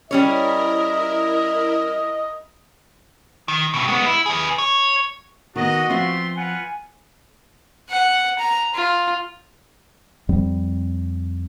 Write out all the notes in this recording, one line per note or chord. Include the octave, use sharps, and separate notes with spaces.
G3 C#4 E4 A#4 C#5 D#5
D#3
G2 B2
G#3 B3
E4
G#4 B4
C#5
D#3 B3 D4 F#4 D#5
F3 A3 C4 F4 E5 C6
F4 B4 F#5 G#5
F#5
A#5
F4
F2 G3 C4